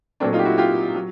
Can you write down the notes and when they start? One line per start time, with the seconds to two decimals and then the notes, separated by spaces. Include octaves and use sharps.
0.20 A#2 F#3 A3 C4 D4
0.33 D#4 F4
0.39 G4
0.45 E4 F#4
0.58 F4 G4
0.95 F#3